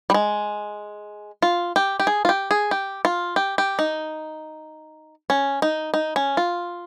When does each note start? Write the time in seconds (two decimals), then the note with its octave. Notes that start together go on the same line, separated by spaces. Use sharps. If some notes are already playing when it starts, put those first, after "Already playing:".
0.10 G3
0.14 G#3
1.42 F4
1.76 G4
2.00 G4
2.07 G#4
2.25 F4
2.29 G4
2.51 G#4
2.71 G4
3.05 F4
3.36 G4
3.58 G4
3.79 D#4
5.30 C#4
5.62 D#4
5.94 D#4
6.16 C#4
6.37 F4